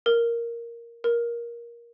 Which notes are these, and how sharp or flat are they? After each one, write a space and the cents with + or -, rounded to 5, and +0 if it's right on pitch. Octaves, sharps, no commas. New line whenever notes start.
A#4 +0
A#4 +15